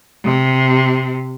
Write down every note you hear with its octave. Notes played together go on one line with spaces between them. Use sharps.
C3